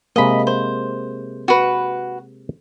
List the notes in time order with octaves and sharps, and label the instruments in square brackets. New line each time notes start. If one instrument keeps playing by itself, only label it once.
[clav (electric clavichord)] C3 G#3 A#3 [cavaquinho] D#5 B5
[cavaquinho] C5
F#4 B4